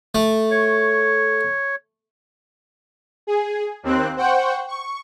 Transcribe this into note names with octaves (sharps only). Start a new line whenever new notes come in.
A3
C#5
G#4
D#2 C4 F#6
C5 F#5 G5 C#6
C#6